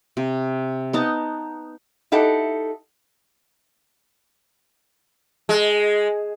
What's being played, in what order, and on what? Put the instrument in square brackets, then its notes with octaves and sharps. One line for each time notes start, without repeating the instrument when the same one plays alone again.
[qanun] C3
B3 D#4 A5 A#5
[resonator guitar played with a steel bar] D#4 E4 G4 A4 F#5
[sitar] G#3